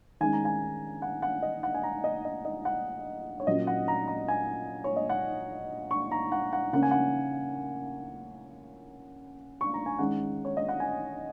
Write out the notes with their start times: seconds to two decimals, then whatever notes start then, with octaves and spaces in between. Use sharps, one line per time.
0.20 D#3 G#3 C#4 G#5
0.33 A#5
0.45 G#5
1.02 F#5
1.22 F#5
1.42 D#5
1.63 F#5
1.74 G#5
1.83 A#5
2.04 D#5
2.25 D#5
2.45 D#5
2.65 F#5
3.40 C#5
3.47 A#2 F#3 A#3 C#4 D#5
3.67 F#5
3.88 A#5
4.08 A#5
4.28 G#5
4.84 C#5
4.96 D#5
5.10 F#5
5.91 C#6
6.11 A#5
6.32 F#5
6.53 F#5
6.73 C#3 A#3 C#4 F#5
6.83 G#5
6.91 F#5
9.61 C#6
9.74 A#5
9.86 G#5
9.99 D#3 G#3 C#4 F#5
10.45 C#5
10.57 D#5
10.69 F#5
10.80 G#5